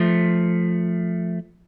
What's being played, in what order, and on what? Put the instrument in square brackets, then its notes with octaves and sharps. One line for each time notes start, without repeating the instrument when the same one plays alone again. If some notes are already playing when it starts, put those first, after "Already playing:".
Already playing: [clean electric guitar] F3 A3